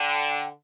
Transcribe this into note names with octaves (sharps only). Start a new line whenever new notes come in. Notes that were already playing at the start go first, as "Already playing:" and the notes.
Already playing: D3 G5